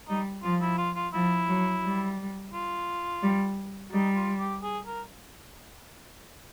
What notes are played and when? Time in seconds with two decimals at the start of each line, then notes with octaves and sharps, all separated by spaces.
0.08 G3 D#4
0.43 F3 F4
0.61 E4
0.78 F4
0.96 F4
1.13 F3 E4
1.48 F#3
1.83 G3
2.53 F4
3.22 G3
3.92 G3 D#4
4.15 F4
4.39 G4
4.62 G#4
4.85 A#4